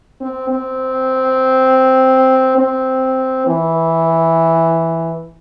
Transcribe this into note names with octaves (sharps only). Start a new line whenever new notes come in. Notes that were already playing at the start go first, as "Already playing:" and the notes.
C4
C4
C4
E3